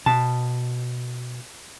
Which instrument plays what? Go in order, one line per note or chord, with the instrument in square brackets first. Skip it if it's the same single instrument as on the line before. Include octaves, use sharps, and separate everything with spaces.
[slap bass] B2 [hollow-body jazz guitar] A5